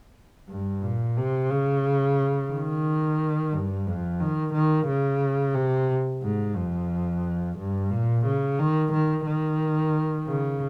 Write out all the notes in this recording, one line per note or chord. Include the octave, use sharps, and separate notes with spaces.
G2
A#2
C3
C#3
D#3
G2
F2
D#3
D#3
C#3
C3
G#2
F2
G2
A#2
C#3
D#3
D#3
D#3
C#3